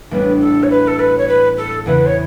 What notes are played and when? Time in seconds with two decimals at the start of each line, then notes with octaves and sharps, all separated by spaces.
0.11 A1 A2 G3 B3 D4 B4
0.40 A4
0.63 C#5
0.70 B4
0.87 A4
0.99 B4
1.18 C#5
1.28 B4
1.57 A4
1.86 E2 C#3 E3 B3 B4
2.06 C#5